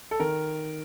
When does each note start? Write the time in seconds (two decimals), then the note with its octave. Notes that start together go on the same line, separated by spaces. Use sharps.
0.11 A4
0.20 D#3 A#4